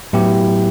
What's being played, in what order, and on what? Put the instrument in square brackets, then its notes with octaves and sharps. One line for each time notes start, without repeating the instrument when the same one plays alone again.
[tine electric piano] A2 F#3 B3 E4 G4